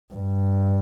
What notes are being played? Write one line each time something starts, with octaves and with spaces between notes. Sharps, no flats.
G2